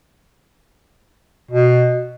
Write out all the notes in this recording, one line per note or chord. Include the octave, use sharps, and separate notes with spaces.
B2